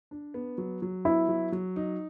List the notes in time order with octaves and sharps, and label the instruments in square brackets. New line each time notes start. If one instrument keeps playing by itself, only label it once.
[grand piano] D4
B3
F#3
F#3
[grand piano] B3 [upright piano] E4
[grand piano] F#3
F#3
D#4